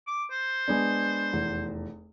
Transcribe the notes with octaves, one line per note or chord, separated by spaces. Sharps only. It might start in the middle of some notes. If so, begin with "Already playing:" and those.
D6
C5
G#3 B3 D4
F1 E2